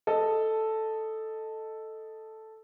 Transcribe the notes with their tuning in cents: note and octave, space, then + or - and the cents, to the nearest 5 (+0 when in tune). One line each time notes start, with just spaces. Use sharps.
A4 +0 D#5 +0